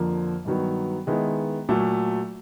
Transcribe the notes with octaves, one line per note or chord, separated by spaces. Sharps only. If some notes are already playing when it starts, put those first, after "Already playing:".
Already playing: F2 D3 F3 A#3
G2 D#3 F#3 B3
D#3 G#3 B3 E4
A#2 F#3 A3